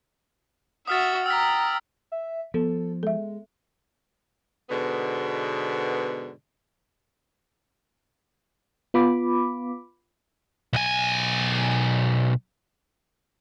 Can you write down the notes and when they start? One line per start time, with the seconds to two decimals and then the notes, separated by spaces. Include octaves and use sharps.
0.87 F#4 E5 D#6 F6 A6
1.26 G5 A#5 E6 F6 B6
2.12 E5
2.54 F3 B3 A4
3.03 G#3 A4 E5
4.69 G#2 B2 D3 B3
8.94 B3 F4 B5 D6
10.73 B1 G#5